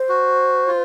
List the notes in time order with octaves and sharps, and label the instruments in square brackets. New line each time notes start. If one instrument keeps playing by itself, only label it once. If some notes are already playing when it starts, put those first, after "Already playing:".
Already playing: [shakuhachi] C5
[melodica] F#4
F4